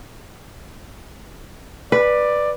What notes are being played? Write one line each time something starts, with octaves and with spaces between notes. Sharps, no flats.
B4 D5